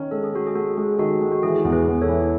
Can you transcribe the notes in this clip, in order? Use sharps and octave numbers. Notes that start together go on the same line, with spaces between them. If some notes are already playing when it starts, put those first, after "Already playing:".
Already playing: D#3 C#4
G#3 A4
G#4
G#3 F#4 A4
G#4
G#3 F#4 A4
G#3 G#4
D#3 F#4 A4
G#3
F#4
E3 G#4
E2
G#4 B4
E2
A4 C#5
E3